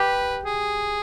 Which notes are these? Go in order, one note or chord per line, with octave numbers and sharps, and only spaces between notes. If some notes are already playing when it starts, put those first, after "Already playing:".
Already playing: G4 B4
G#4